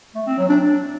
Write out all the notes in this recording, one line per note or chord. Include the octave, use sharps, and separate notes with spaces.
A3
C4
F#3
D4
D4